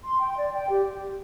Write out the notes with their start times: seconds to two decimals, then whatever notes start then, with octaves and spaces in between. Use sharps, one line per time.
0.03 C6
0.19 G5
0.36 D5
0.52 G5
0.69 G4